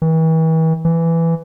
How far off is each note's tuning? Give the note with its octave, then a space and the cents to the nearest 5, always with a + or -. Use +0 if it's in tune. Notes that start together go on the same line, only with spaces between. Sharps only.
E3 -40
E3 +10